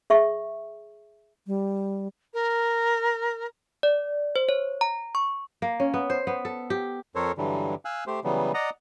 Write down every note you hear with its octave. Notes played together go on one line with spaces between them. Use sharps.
G#4 E5 C#6
G3
A#4
D5
C5
C#5
A#5
C#6
A#3
C#4
B3
C5
B3
A4
G4
F2 A4 A#4 C5 C#5
G2 D3 E3 F#3 G3
F5 G#5 E6 F#6
A3 G4 C5
C#3 E3 F#3 G3 B3
D5 D#5 F#5 A#5 D#6